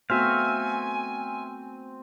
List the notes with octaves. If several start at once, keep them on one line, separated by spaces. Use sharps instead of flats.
A3 B3 C4 F#4 E5 F5 G#5